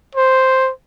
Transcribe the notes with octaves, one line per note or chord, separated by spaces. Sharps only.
C5